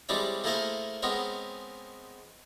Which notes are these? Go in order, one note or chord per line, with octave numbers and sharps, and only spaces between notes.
G3 G#3 C4 D4 E4 C#5
A3 A#3 E4 G#4 A#4 C5
G#3 B3 C4 A#4 C#5